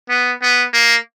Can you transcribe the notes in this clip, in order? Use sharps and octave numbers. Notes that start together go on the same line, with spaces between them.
B3
B3
A#3